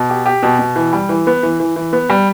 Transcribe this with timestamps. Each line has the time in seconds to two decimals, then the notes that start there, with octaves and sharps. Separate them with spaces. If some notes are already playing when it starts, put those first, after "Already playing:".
Already playing: B2
0.10 G4
0.26 G4
0.43 B2
0.59 B2
0.76 E3
0.93 G3
1.09 E3
1.27 B3
1.43 E3
1.60 E3
1.76 E3
1.93 B3
2.10 G3